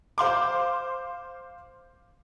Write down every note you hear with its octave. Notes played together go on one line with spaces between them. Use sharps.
C5 F5 C6 D6